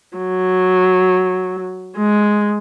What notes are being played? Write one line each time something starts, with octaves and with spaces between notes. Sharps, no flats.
F#3
G#3